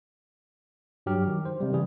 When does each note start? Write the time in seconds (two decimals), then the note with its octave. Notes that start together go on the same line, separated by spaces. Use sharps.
1.06 G2 F#3 G4 F6
1.27 D#3
1.45 C5
1.60 C3 G3
1.72 C#3 E3 G3 G#4